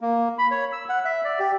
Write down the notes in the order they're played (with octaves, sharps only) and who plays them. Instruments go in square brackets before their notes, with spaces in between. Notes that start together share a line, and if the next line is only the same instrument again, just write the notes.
[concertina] A#3
B5
C#5
E6
F#5
E5
D5
G4